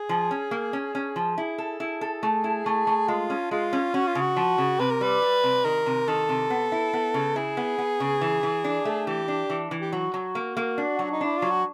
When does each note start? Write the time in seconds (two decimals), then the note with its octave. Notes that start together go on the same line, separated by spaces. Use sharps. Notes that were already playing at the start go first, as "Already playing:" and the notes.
Already playing: G#4
0.09 F3
0.31 C#4
0.51 A#3
0.73 C#4
0.95 C#4
1.16 F3
1.37 E4 G#4
1.58 A4
1.80 E4
2.01 A4
2.23 A3
2.44 E4
2.66 A3
2.87 A3
3.08 G#3 F4
3.30 C#4
3.51 G#3 F4
3.73 C#4
3.94 C#4 F#4
4.07 F4
4.15 C#3
4.21 F#4
4.36 F3
4.58 C#3
4.79 C3 B4
4.91 A#4
5.01 G3 B4
5.22 G3
5.44 C3
5.65 D#3 A#4
5.86 C3
6.08 D#3 A4
6.29 C3
6.50 B3
6.72 E4
6.93 B3
7.14 C#3
7.36 E4 G#4
7.57 B3
7.78 B3
8.00 C#3
8.21 E3
8.43 E3
8.64 D4
8.85 A3
9.07 E3 G4
9.28 D4
9.50 E3
9.71 E3
9.80 G4
9.93 F#3 F#4
10.14 F#3
10.35 A#3
10.57 A#3
10.78 D4
10.99 F#3
11.12 D#4
11.21 D4 E4
11.37 F#3 F4
11.51 F#4